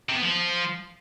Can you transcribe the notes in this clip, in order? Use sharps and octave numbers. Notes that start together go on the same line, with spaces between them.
C3
B3
F3